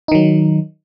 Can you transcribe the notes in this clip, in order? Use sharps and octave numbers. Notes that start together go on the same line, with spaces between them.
D#3 F#3 D#4